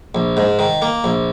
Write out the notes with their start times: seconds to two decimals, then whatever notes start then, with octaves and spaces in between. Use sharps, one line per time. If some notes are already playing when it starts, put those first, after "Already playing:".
0.15 A#1
0.37 G#2
0.59 D#3
0.82 A#3
1.04 A#1